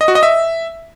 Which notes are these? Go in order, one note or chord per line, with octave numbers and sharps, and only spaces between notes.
D#5
F#4
D#5
E5